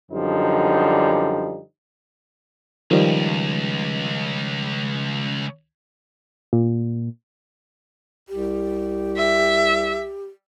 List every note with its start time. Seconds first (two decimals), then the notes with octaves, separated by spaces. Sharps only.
0.11 F#2 D3 F3 G3 D#4
2.91 C#2 D#3 F3 G3
6.53 A#2
8.29 C2 G4
9.17 E5